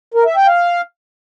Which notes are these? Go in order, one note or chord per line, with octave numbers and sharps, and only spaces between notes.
A#4
E5
G5
F5